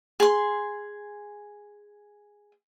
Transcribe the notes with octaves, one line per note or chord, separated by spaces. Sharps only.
G#4 C6